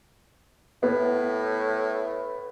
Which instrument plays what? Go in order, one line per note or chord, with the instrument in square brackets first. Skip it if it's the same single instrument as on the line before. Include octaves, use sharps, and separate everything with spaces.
[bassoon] A2 [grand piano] B3